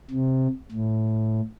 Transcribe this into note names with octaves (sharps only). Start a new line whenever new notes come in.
C3
A2